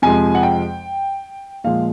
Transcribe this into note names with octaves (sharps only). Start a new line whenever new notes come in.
F2 C3 F3 G#3 G#5
F#5
G5
A#2 F3 G#3 F5